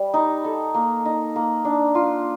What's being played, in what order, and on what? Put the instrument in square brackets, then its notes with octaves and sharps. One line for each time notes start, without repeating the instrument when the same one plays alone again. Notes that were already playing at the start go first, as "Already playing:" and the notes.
Already playing: [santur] G3
D#4
A4
A#3
D#4
A#3
D4
F4